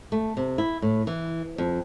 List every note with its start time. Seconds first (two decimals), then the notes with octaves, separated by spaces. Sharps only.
0.12 A3
0.37 C3
0.58 E4
0.82 A2
1.07 E3
1.58 F2